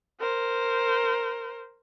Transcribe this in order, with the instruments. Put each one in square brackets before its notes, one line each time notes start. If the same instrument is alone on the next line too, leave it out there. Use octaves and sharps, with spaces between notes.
[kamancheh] A#4 C5